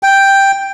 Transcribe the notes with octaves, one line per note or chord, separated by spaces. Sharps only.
G5